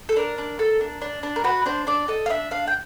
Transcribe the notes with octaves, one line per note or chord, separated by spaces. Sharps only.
A4
D4 A#4
D4
A4
D4
D4
D4
A#4
F#4 B4
D4 C5
D4 D5
A4 D#5
F5
D4 E5
D4 F5
G5